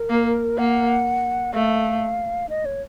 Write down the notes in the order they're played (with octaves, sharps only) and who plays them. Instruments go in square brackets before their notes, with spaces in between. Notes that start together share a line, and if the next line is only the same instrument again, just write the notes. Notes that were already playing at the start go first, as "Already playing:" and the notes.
Already playing: [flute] A#4
[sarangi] A#3
[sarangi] A#3 [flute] F#5
[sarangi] A3 [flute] F5
[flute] D#5
C#5